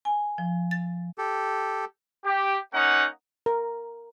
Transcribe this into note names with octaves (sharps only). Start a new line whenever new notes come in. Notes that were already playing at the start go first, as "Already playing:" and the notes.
G#5
F3
A6
G4 A4
G4
A#3 C#4 D#4 F#5
A#4